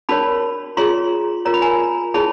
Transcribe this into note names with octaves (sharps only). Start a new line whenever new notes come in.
D4 F#4 A#4 C#5 A5 B5
F4 G#4 C#5 A#5 C6
F4 A#4 C#5 A#5
B5
G#5 A#5
E4 G#4 C#5 A5 B5